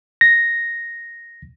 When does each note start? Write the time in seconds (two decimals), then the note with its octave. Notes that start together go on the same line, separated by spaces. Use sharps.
0.21 A#6